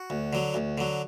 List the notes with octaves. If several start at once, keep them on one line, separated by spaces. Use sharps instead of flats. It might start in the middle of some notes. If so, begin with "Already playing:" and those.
Already playing: F#4
D2
D3 F#3
D2
D3 F#3